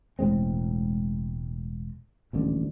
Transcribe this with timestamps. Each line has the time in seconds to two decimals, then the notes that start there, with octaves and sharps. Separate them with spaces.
0.19 E1 A2 G#3 C4
2.33 D#1 A1 D2